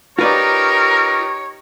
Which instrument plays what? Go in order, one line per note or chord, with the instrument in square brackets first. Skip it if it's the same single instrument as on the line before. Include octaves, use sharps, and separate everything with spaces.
[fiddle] D#4 G4 [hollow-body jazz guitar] F4 B4 D5 [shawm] A#4 [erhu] C#5